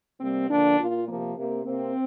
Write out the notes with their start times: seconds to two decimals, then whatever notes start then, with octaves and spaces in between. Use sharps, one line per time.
0.20 C3 G3 A#3 C4
0.49 D3 F3 A#3 D4
0.78 A#2 A#3 F4
1.07 C3 F3 A#3
1.35 C3 A#3
1.64 C3 A#3 C4